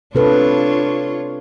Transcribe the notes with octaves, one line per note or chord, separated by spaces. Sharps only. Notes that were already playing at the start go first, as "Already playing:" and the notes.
C3 D4 F4 A4 B4 C#5